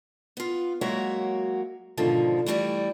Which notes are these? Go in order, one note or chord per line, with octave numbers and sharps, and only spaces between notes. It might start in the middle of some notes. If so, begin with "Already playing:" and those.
B3 F4
F#3 G#3 A#3 F#4 C#5 E5
G#2 B2 D3 D#3 F3
E3 G3 A3 E4